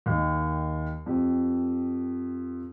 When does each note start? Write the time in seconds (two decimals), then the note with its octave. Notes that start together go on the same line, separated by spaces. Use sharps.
0.06 D#2 D#3
1.06 F2 G4